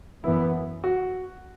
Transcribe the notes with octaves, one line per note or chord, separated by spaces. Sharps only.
F#2 E3 B3 E4
F#4